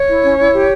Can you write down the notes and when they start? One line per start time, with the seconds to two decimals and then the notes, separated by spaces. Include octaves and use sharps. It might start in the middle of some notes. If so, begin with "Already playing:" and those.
Already playing: C#5
0.08 E4
0.23 C#4
0.39 E4
0.53 G4